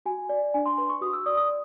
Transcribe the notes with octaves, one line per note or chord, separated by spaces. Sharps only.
F#4 G#5
D5
D4 G#5
C6
B4 C6
C#6
F#4 D#6
E6
D5 D#6
D#6